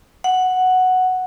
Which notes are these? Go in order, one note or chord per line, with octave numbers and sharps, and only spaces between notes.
F#5